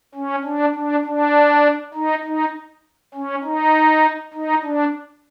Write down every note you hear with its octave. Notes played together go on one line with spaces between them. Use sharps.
C#4
D4
D4
D4
D#4
D#4
C#4
D#4
D#4
D4